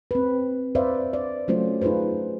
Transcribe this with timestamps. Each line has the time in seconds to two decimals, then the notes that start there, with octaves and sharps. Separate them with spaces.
0.11 C4 B4
0.75 B4 C5 D5 E5 F5
1.13 D5
1.48 F#3 A3 C#4 F4 C5
1.82 D#4 F4 G#4 B4 C5